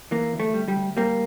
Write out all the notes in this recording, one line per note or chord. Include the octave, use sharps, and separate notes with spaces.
E3 A#3
D2
A3
G3
G3
D2
G3 A#3